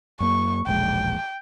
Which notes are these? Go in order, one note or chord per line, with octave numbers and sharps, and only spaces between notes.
F#2 A#3 C#6
E1 A#1 G#3 G5